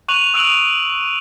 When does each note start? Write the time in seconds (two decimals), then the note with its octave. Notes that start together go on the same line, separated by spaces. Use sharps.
0.08 C#6 F#6 D#7 F7 F#7
0.34 D#6 E6 F#6 D7 F7 F#7